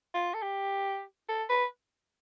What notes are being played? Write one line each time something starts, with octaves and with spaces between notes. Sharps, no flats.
F4
A4
G4
A4
B4